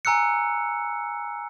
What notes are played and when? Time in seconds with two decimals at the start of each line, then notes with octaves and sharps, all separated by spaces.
0.05 G#5 A#5 E6 F#6 C#7